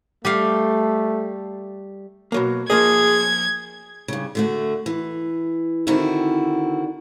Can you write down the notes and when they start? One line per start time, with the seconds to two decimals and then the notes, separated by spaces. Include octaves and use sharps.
0.25 G3 A3 G4 F5
2.32 B2 F#3 A#3
2.70 F3 A#3 G#4 D#5 G#6
4.08 G2 C#3
4.35 D3 A3 F#4
4.86 E3
5.87 D3 D#3 C4 E4 F#4